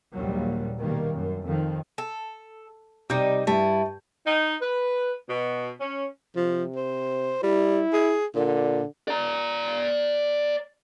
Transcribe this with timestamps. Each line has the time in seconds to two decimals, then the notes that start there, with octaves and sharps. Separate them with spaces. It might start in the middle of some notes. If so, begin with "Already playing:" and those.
0.16 A#1 D#2 A#2 F#3 G3
0.80 B2 D#3 G3 A#3
1.17 F#2
1.47 F2 D#3 F3
1.98 A4
3.10 C3 G3 D#4 G6
3.47 G2 E4 G4 A5
4.26 D#4
4.61 B4
5.29 B2
5.80 C#4
6.36 C3 F3
6.76 C5
7.43 G3 E4
7.93 G#4
8.35 A#2 D3
9.08 D5 A#5